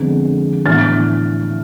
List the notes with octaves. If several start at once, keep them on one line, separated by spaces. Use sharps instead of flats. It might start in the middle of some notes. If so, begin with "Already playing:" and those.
Already playing: F2 D3 G#3 B3
A2 E3 B3 D4 F6 A6